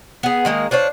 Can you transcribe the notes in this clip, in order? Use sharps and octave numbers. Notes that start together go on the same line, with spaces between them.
B3 G#4
D#3 G#3 A#3 D#5
D4 F4 C5 C#5